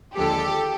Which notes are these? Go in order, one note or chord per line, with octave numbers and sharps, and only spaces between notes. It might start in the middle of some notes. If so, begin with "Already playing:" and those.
D#2 D3 F3 G#3 G4 A4